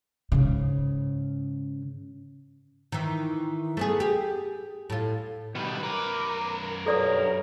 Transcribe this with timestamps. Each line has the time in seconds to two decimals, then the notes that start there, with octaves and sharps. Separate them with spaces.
0.32 G#2 C#3
2.92 D#3 E3
3.77 A3 B3 G#4
4.00 G4 G#4
4.90 A2 F4
5.55 B2 D#3 G3 B4
5.83 F#2 A#4 B4 D6
6.86 G2 F#3 A4 D5 A#5 D#6